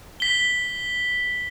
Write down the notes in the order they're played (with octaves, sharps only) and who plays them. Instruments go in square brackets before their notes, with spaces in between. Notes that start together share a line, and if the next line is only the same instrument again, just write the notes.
[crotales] B6 G7